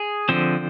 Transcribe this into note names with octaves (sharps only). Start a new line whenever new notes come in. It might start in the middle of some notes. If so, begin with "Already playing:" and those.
Already playing: G#4
D3 F3 C4